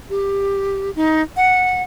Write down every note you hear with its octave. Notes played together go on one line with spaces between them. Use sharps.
G4
D#4
F#5